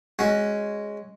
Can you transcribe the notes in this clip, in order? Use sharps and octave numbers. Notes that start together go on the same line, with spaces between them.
G#3 C#4 F#4